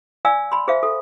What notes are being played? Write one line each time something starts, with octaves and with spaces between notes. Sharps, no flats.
D5 F5 G#5 E6
B5 C6
G#4 C5 E5 F5
A4